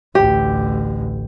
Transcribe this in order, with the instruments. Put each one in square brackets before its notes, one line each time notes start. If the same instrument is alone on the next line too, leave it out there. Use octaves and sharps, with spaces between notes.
[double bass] A1 D2 [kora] G4